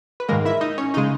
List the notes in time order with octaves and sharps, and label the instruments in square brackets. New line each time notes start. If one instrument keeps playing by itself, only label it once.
[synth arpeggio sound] B4
G#2 D#3 G#3 A#3 A#4
E4 E5
D#4 D#5
C#4 C#5
C#3 G#3 D#4 D#5